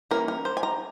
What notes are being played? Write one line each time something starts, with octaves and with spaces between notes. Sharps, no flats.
E3 A#3 C#4 A#4
A#4
C5
G#5
A#5